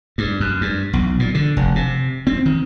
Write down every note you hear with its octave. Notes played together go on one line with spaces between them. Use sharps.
G2
F#2
G2
B1
A#2
D3
F1
C3
C4
D#3